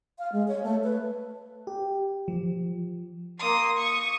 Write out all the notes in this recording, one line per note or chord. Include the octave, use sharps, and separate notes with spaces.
F5
G#3
C#5
A3
B4
G4
F3
A#3 C6 D#6
C#6 D#6